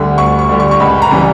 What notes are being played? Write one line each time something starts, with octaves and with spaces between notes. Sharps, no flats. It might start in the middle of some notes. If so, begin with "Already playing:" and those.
Already playing: D2 D3 G3
D2 C#6
C#6
D3 G3
C#6
C#6
C#2 B5
A#5
C#3 E3 G3